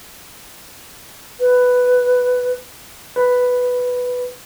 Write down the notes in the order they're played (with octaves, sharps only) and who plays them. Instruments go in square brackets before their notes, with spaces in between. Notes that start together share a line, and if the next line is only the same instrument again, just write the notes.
[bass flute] B4
[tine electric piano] B4